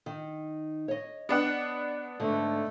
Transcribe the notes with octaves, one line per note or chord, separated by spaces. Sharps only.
D#3
C#5 D#5
B3 D4 F#5
G#2 D3 A3